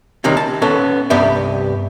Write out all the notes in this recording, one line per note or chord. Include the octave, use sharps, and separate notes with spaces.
C2 C3 D#3 C4 C#4
A5
B3 C#4 A4
C2 G2 B3 G4 D5 E5